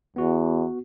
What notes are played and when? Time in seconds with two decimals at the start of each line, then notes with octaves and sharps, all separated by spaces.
0.16 E2 B3 F#4